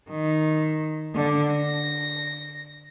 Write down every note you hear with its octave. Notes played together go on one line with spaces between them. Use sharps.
D#3
D3
A#6